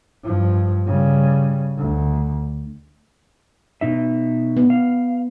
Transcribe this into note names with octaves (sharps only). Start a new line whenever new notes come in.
G2 F3
C#3 G3
D2
B2 D#4 E5
B3
F5